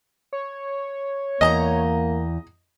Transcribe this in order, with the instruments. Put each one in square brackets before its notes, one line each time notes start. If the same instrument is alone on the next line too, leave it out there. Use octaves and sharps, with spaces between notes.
[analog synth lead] C#5
[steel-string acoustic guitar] E2 A5 A#5 [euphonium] A#3 [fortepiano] D#5